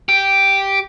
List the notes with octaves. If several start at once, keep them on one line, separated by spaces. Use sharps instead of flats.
G4